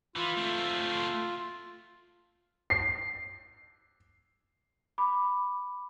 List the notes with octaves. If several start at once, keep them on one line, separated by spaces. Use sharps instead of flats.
E3 F4
A3 C4
C7
B5 D6